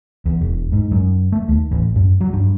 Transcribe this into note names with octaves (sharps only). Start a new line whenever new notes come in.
E2
E1
G#2
F#2
A3
D#2
A1
F#2
F#3
G2